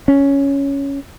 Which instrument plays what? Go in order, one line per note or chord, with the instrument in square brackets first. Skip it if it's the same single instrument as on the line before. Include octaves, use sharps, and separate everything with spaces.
[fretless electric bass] C#4